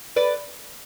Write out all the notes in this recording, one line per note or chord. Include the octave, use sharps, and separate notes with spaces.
B4 D5